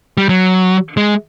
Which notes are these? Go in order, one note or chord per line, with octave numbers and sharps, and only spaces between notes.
G3
F#3
G#3